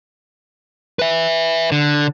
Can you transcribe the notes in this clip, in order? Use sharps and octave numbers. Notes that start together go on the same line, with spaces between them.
B4 E5
D3